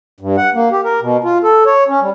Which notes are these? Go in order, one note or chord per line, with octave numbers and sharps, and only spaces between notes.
G2
F#5
A#3
G4
A#4
B2
F4
A4
C#5
C#4
G3